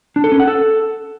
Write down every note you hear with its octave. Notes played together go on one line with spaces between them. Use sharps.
D4
A4
C#4
F#5
A4